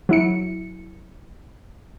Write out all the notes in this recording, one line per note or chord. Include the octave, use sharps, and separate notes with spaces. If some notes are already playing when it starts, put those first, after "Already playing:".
F#3 E4 C#7